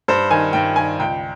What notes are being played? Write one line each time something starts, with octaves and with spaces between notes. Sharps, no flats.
G2 C5
D#3 G#5
G2 G5
D#3 G#5
C#2 G5